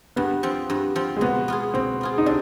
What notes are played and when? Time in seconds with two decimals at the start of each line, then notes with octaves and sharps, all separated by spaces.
0.16 G2 B3
0.43 F3 C4
0.70 G2
0.96 F3 C4
1.16 G#3
1.21 B2 B3
1.48 B3 F4 G#4
1.74 B2 C4
2.01 B3 F4 G#4
2.18 D#4
2.26 C3 D4